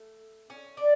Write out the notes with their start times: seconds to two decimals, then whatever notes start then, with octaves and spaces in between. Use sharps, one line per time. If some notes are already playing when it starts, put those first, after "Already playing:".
Already playing: A3
0.50 C#4
0.77 D4